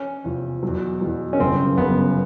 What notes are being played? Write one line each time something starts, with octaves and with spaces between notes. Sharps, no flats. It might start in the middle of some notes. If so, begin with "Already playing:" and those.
Already playing: C#4
E2 C3 F3
E2 B2 F#3
E2 B2 F#3
C#4
G1 F#2 C#3 C4
G1 F#2 C#3 B3